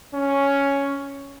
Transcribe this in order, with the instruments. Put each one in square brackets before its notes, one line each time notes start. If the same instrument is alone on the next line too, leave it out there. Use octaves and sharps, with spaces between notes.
[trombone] C#4